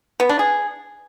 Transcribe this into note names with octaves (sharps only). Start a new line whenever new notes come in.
B3
D4
G#4